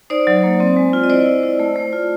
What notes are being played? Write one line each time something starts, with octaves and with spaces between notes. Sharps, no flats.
D#4 C5 D5
F#3
A#3
C4
G#3
F4
D#5
E4 C5 D5
E4
E4
A3
A3
F4